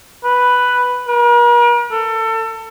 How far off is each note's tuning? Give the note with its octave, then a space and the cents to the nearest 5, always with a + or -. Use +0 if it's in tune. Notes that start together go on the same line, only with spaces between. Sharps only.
B4 +0
A#4 +45
A4 +30